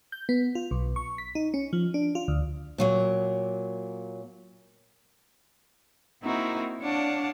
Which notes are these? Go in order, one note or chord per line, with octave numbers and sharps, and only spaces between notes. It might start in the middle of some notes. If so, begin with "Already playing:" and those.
G6
B3
F4
B1
C#6
B6
D#4
C#4
F3
D4
F4
D2
A#2 F#3 A#3
A#3 C4 D#4 E4 F#4 A#4
D4 C#5 D5 F5 F#5 A5